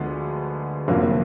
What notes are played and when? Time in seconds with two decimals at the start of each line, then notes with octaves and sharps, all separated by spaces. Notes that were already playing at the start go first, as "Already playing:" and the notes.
Already playing: D2 D3 F3 G#3 B3
0.88 F1 F2 D3 F#3 A#3